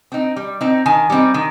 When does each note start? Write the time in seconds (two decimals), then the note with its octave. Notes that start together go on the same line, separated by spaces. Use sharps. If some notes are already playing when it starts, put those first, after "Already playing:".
0.12 C4 D#4
0.36 G3
0.61 C4 D#4
0.86 D#3 G#5
1.10 G3 C4 D#4
1.34 D#3